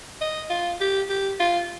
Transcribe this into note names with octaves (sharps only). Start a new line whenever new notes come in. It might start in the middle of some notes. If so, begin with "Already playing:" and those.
D#5
F4
G4
G4
F4